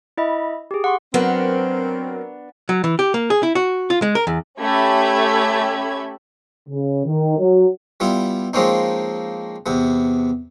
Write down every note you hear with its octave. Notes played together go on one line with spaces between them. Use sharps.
E4 D#5 E5 B5
G4 G#4
F#5 C6 C#6
F#3 B3 C4 D4 A#4
F#3
E3
G4
A#3
G#4
E4
F#4
F4
G#3
A#4
E2
A3 C#4 G4 E5 B5 G#6
C#3
D#3
F#3
G3 B3 E4 F4
F3 G#3 A#3 C4 C#4 D#4
E2 C3 B3